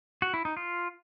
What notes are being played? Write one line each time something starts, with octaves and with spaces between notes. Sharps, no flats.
F#4
E4
D#4
F4